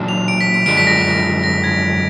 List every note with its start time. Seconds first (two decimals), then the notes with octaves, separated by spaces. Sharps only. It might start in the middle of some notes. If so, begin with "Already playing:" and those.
Already playing: A#2 F#3 D4
0.08 F7
0.28 D7
0.41 B6
0.54 D7
0.66 F#2 D3 F3 G#3 D4 D7
0.77 B6
0.87 A#6
0.98 B6
1.44 A#6
1.64 G#6